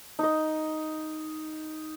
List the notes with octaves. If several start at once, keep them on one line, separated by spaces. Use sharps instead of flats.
D#4 D#5